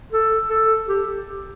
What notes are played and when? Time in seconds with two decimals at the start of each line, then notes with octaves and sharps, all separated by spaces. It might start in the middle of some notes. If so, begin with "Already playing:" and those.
0.12 A4
0.49 A4
0.88 G4